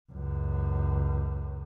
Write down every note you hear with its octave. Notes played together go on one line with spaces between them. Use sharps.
C#2 F#2